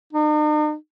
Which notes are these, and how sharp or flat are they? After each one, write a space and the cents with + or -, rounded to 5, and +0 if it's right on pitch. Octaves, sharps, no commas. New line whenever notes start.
D#4 -45